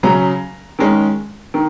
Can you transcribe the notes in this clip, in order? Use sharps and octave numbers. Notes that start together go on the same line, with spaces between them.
C#3 F#3 C#4 A#5
D#3 G#3 C#4
D#3